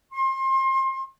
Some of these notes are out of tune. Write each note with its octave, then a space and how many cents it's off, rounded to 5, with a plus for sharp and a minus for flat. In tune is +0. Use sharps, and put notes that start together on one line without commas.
C6 +30